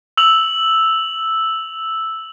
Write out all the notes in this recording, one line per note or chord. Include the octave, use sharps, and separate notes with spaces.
E6 F7 F#7